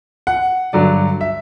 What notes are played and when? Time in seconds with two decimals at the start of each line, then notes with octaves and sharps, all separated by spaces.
0.27 F#5
0.73 G2 D3 F#3 D5
1.21 E5